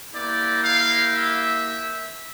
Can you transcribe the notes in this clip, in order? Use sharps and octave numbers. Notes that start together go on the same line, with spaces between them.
A#3 E4 G4 D5
F5
E5